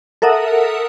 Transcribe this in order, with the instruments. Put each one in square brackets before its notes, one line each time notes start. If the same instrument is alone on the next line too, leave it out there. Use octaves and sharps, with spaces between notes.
[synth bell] A4 A#4 E5 F#5 D#6